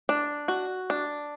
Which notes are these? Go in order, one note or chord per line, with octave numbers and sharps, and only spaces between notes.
D4
F#4
D4